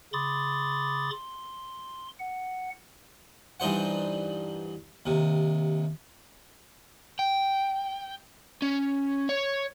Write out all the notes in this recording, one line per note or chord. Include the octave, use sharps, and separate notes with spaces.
C#3 B5 C6 D6 D#6 A6
C6
F#5
G2 E3 D#4 C5 F#5
D#2 C3
G5
C#4
C#5